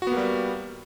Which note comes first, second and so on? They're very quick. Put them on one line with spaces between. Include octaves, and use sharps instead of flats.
F#4 B3 A#3 G3